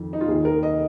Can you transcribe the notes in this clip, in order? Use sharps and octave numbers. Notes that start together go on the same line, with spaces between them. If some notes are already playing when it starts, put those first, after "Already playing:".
Already playing: F2 D#3
D#4
F4
D#2 D#3 G#4
A#4
D#5